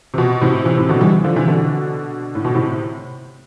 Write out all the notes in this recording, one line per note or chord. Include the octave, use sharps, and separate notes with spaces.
C3
B2
A2 C3
C3 E3
A2 C3
B2 D3
E3 G3
D3 F3
C3 E3
B2 D3
A2
B2
A2 C3